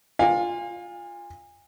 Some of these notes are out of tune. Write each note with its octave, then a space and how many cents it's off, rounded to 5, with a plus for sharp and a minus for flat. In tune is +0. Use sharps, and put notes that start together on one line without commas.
F4 +0 F5 +25 G#5 -30